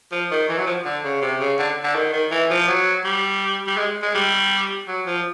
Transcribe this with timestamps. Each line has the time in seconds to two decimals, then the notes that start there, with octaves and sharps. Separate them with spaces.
0.12 F3
0.31 D#3
0.49 E3
0.58 F#3
0.67 F3
0.85 D3
1.04 C#3
1.22 C3
1.40 C#3
1.59 D3
1.84 D3
1.95 D#3
2.13 D#3
2.31 E3
2.50 F3
2.68 F#3
3.04 G3
3.67 G3
3.77 G#3
4.02 G#3
4.14 G3
4.88 F#3
5.06 F3